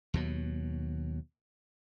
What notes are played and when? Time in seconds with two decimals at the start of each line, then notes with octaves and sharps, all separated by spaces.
0.14 D#2 B2 F#3